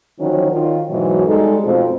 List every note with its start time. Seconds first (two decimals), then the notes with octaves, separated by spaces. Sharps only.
0.19 D3 D#3 F3 F#3 C#4
0.52 D#3 F4
0.89 G#2 B2 E3 F#3
1.26 G3 G#3 D#4 A4
1.64 F2 B2 F3 A3 C4